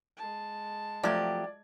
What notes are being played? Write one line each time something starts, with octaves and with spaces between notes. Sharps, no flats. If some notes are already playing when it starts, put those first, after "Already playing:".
G#3 A5
C3 F3 F#3 A3 G4 D5 G#6